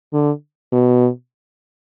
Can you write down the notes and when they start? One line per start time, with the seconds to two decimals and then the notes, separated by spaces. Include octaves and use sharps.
0.13 D3
0.72 B2